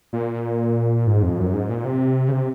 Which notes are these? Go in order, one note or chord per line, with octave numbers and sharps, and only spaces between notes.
A#2
G#2
F2
F#2
G#2
A#2
C3
C#3
C3